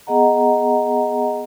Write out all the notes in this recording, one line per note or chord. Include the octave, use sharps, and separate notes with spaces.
B3 G#4 D#5 F#5 A#5